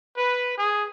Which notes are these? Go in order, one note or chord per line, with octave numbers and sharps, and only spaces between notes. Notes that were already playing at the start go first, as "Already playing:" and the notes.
B4
G#4